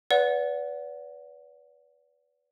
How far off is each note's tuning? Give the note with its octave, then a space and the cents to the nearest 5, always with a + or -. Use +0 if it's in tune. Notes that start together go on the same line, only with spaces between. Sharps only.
B4 +0 D5 -40 F#5 -15